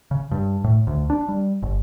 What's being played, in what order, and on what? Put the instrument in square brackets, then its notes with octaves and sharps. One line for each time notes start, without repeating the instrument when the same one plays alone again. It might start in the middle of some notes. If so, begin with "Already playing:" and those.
[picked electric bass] C#3
G2
A2
D2
D4
G3
G1